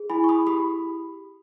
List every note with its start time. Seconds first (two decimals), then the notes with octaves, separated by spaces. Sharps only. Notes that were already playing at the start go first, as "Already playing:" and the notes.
Already playing: G#4
0.10 E4 G#5 B5
0.24 C#6
0.29 B5 D#6
0.47 G4 B5 D#6